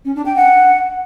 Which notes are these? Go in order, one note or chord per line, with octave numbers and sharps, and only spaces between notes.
C#4
D4
G5
F#5